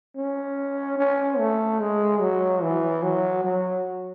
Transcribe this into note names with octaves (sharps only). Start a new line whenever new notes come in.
C#4
C#4
A3
G#3
F#3
E3
F#3
F#3